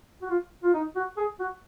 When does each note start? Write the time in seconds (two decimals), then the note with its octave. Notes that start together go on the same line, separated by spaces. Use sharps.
0.22 F#4
0.30 F4
0.63 F4
0.74 D#4
0.96 F#4
1.17 G#4
1.39 F#4